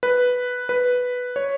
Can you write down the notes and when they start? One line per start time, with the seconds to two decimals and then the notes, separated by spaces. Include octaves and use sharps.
0.03 B4
0.69 B4
1.36 C#5